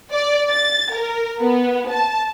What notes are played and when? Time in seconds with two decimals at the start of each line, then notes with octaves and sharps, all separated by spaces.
0.13 D5
0.50 A6
0.94 A#4
1.41 B3
1.90 A5